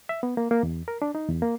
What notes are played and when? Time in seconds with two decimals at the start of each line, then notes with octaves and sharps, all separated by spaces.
0.09 E5
0.23 B3
0.37 A#3
0.51 A#3
0.63 E2
0.88 A#4
1.02 D4
1.15 D#4
1.29 E2
1.42 A#3